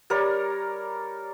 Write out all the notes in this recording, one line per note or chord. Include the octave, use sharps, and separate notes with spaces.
G3 A#4 C#5 D5